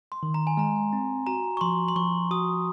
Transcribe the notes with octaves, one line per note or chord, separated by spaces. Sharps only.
C6
D#3
A#5
G#5
G#3 A#5
C4
F#4 A#5
C#6
F3 C6
C6
F3 C#6
F#4 D#6